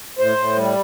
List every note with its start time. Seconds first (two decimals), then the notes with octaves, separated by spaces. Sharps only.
0.19 A2 C5
0.37 A2
0.56 G3